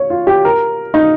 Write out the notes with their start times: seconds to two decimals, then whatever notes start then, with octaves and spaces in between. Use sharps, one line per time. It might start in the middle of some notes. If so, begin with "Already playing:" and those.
Already playing: C#5
0.10 F4
0.27 G4
0.45 A#4
0.94 D#4